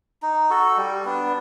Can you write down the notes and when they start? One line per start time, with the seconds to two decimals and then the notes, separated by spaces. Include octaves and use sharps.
0.22 D#4
0.50 F#4 A4
0.77 G3
1.05 B3 D4